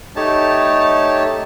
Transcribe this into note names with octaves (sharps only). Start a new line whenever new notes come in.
A3 D#4 G4 C#5 A5